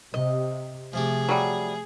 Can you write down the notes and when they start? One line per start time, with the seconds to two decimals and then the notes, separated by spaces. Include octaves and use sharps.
0.14 C3 D#5
0.93 C3 F3 A3 G4 G#4
1.29 F#3 G3